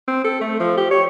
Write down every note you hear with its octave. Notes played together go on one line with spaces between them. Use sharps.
C4
A4
A3
F3
G4
C#5